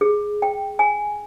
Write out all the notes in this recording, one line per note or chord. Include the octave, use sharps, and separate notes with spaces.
G#4
G5
G#5